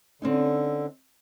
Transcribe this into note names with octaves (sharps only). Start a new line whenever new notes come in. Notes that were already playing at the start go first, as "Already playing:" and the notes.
D3 C4 C#4 D#4